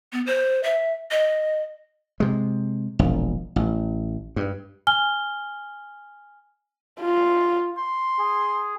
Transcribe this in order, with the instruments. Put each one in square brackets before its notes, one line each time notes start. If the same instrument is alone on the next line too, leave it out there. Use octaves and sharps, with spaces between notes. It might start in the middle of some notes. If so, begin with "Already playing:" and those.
[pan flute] B3
C5
E5
D#5
[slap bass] C3 G#3
E1 A#1
A1
G2
[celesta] G#5 F6 G7
[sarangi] F4
[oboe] C6
[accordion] G#4